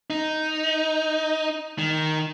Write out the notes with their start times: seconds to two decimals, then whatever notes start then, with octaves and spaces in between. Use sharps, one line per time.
0.10 D#4
1.78 D#3